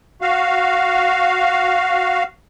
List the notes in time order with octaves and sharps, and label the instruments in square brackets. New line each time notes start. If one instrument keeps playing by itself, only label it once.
[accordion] F#4 F5